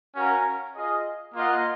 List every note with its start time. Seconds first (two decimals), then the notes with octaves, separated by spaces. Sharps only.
0.16 C#4 F#4 A#4 F5
0.75 F4 G#4 D#5
1.35 A#3 F4 A#4 D#5 F#5